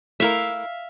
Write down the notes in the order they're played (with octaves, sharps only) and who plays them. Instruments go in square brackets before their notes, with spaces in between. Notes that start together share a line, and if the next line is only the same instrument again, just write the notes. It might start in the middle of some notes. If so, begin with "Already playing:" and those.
[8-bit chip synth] A3 E4 A#4 [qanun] E5 F5